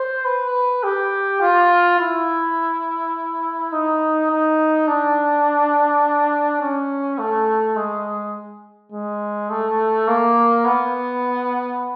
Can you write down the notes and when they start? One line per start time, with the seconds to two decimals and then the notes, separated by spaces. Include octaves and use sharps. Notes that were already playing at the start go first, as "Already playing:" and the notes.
Already playing: C5
0.25 B4
0.83 G4
1.41 F4
1.99 E4
3.72 D#4
4.30 D#4
4.88 D4
6.61 C#4
7.19 A3
7.76 G#3
8.92 G#3
9.50 A3
10.08 A#3
10.65 B3